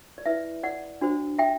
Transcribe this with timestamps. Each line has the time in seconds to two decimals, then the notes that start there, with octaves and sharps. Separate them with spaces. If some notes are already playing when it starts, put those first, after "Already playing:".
0.18 D5
0.26 E4 B4 E5
0.63 D5 F#5
1.01 D4 F#4 C5
1.39 E5 G5